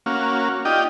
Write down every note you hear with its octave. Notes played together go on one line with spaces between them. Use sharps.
A#3 C#4 F#4 F5
D#4 F4 G4 D5 D#5 G5